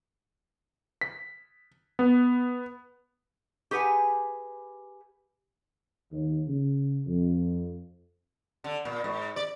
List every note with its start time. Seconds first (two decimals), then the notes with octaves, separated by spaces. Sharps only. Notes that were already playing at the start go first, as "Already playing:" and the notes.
1.01 B6
1.99 B3
3.71 G4 G#4 B4 F#5 G#5
6.12 D#2
6.48 C#3
7.07 F2
8.64 D3
8.85 A#2
9.04 G#2
9.36 D5